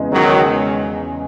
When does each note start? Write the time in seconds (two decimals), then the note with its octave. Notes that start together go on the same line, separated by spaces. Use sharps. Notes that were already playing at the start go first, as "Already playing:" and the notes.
Already playing: E2 C#3 G#3
0.12 D#3 F#3